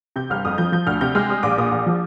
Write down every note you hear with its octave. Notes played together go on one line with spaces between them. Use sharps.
C3 G6
G1 F6
F2 D#6
F3 G6
F3 G6
D2 F6
C3 G6
G#3 F6
G3 D#6
A#1 D6
A#2 D#6
A#1
F3